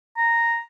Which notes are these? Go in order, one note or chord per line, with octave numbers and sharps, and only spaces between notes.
A#5